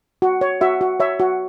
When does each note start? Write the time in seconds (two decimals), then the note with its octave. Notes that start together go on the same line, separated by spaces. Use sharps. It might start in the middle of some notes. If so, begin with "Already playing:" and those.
0.22 F#4
0.41 C#5
0.61 F#4 E5
0.81 F#4
1.00 C#5 E5
1.20 F#4